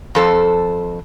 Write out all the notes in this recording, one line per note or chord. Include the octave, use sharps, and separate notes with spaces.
F2 A4 C5